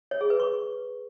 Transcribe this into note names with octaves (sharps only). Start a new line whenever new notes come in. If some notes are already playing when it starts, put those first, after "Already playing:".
C#5
G#4
B4
C#6